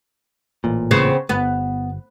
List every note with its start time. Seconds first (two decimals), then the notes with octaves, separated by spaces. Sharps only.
0.64 A1 A#2
0.91 C#3 B3 C4
1.29 G1 B3